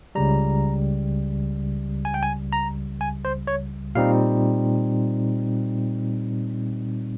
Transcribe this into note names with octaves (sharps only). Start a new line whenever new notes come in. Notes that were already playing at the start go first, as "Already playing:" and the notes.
C#2 C#3 G3 A#5
G#5
G5
G#5
A#5
G#5
C5
C#5
A#2 G3 C4 D#4 F5